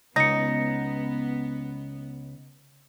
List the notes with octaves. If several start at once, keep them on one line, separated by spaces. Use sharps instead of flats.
C#2 B3 D#4 A#6 C#7